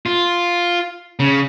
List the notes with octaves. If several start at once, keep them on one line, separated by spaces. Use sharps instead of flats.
F4
C#3